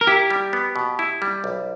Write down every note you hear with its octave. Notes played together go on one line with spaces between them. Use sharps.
A#4
E4 G4
G3
B3
B2
E4
G3
B1